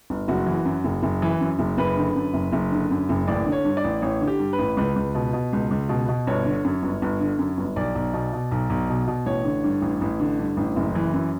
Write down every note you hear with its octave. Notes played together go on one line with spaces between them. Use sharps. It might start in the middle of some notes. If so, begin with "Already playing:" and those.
G1
F#1 F#4
E3
F#2
F#1
F#1
E3
F#2
F#1
F#1 B4
D3
F#2
F#1
F#1
D3
F#2
F#1
A1 D5
D3
C#5
G2
D5
A1
A1 C#5
D3
G4
G2
B4
A1
C#2 B4
C#2
B2
B2
C#2
C#2
B2
B2
G1 C#5
D3
F#2
G1
G1
D3
F#2
G1
B1 D5
B1
B2
B2
B1
B1
B2
B2
A1 C#5
D3
G2
A1
A1
D3
G2
A1
F#1
E3
F#2